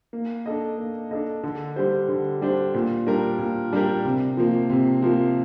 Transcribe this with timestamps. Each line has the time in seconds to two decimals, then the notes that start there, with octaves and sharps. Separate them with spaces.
0.13 A#3
0.46 D4 A4 D#5
0.78 A#3
1.11 D4 A4 D#5
1.43 D3
1.76 G3 D4 G4 C5
2.09 D3
2.42 G3 D4 G4 C5
2.74 A#2
3.07 G3 D4 G4 A#4
3.39 A#2
3.73 G3 D4 G4 A#4
4.05 C3
4.37 F3 A#3
4.70 C3
5.02 F3 A#3